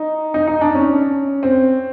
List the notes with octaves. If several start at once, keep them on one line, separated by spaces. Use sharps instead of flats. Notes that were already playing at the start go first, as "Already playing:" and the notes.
Already playing: D#4
D#4
D#4
D4
C#4
C4